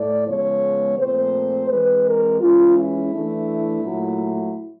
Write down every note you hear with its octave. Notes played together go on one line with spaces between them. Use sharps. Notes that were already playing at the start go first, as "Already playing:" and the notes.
Already playing: A2 A3 D5
C#3 F3 G#3 B3 C#5
A#2 F3 A3 C4 C5
E3 G#3 C4 B4
A#4
E3 G#3 C#4 F4
E4
E3 A3 D4
A#2 F#3 A3